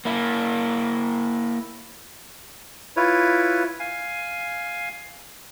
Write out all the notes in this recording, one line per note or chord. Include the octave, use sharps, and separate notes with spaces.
A#3 E4
E4 F4 B4 C#5
F5 G#5